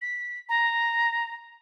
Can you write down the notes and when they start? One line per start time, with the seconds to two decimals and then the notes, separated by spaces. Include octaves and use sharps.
0.01 B6
0.49 A#5